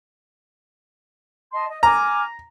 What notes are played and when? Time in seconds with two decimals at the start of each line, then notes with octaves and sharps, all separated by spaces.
1.52 D#5 A5 C6
1.68 D#5
1.83 G#5 A#5 D6 F6